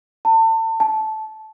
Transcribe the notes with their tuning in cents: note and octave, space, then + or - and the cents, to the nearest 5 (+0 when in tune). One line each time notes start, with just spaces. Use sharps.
A5 +35
A5 -15